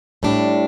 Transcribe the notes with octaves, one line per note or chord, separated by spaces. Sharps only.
A2 G3 D4